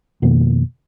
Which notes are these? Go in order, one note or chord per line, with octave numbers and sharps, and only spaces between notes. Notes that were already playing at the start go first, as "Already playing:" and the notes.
F2 B2 D#3 A#3